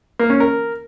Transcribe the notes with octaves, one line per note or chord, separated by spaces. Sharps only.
A#3
C#4
A#4